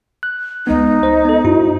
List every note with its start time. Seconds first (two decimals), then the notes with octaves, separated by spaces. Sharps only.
0.23 F#6
0.67 C#2 G#3 B3 D#4
1.03 C5
1.25 B3 A4
1.44 G2 E4 F#4